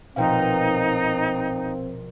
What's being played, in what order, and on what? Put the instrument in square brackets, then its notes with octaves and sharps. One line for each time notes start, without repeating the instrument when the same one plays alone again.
[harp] A#1 B2 [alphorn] C4 [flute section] D#4 [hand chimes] F5 G5